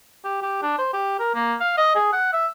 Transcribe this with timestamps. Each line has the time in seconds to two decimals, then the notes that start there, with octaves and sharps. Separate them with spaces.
0.24 G4
0.42 G4
0.62 D4
0.78 C5
0.93 G4
1.20 A#4
1.35 A#3
1.60 F5
1.77 D#5
1.95 G#4
2.13 F#5
2.33 E5